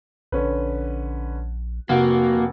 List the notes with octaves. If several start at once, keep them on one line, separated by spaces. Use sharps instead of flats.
A#1 D3 C#4 B4
F1 C3 A#3 F#4 F5 F#5